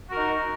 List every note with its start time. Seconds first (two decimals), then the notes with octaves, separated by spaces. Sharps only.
0.08 F#4
0.12 A#4
0.17 D#4